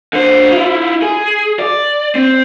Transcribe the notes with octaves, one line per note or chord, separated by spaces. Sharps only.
D3 C5
E4 F4
G#4
D5
C4